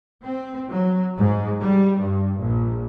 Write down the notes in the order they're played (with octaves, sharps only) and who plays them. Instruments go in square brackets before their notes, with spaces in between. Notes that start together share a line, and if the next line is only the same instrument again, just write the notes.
[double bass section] C4
F#3
G#2
G3
G2
A#1